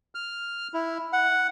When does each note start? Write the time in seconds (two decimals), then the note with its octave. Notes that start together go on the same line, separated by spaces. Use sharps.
0.15 F6
0.74 E4
1.13 F#5